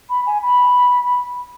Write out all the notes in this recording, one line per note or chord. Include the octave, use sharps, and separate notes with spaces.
B5
G#5
B5